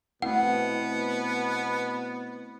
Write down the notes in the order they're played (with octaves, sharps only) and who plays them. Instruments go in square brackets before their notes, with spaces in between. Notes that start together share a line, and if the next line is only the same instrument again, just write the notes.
[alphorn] B2 [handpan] A3 C4 E4 [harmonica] B3 [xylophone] F#5